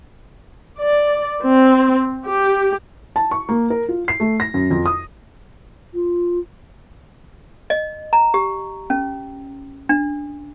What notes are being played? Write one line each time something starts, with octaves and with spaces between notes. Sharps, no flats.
D5
C4
G4
A5
C#6
A#3
A#4
F4
C7
A3
A#6
F#2
F2
D#6
F4
D#5
A#5
G4
C#4
D4